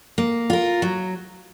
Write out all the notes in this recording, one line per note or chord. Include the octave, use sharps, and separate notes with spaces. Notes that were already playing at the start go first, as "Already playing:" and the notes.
A#3
F4 A#4
F#3